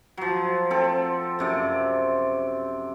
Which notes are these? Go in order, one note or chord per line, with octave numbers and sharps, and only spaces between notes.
F3 F#3
C4 A4
F#2 C3 D5